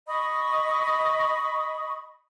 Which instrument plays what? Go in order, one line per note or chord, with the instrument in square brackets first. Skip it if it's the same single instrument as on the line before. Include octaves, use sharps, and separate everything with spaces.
[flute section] D#5 B5 C#6 D#6